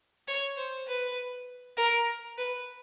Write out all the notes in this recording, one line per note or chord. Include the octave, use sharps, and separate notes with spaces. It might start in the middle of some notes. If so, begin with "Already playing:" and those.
C#5
C5
B4
A#4
B4